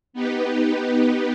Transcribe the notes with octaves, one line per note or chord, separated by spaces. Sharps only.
B3 D#4 G4 B4